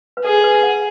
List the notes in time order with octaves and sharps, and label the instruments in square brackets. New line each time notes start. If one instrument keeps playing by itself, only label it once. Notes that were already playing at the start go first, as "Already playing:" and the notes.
[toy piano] B4
[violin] G#4 [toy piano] A4
[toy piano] B4
F#5